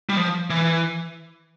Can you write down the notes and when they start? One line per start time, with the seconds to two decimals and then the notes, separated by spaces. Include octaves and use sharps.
0.09 G3
0.17 F3
0.50 E3